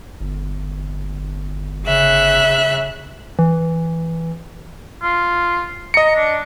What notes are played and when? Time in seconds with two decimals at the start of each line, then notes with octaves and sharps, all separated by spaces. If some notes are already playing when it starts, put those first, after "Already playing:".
0.20 G1
1.86 C#3 E5 F#6
3.39 E3
5.03 F4
5.94 D#5 A#5 C#7
6.15 D4